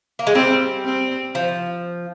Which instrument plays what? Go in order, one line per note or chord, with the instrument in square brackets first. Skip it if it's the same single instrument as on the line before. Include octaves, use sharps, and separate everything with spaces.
[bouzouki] A#3
G#3
[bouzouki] G3 [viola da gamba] C4
[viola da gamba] C4
[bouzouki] F3